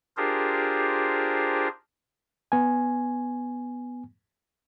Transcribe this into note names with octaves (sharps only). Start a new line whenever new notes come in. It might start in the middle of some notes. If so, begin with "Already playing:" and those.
D4 F4 G4 G#4 A#4 C5
B3 G#5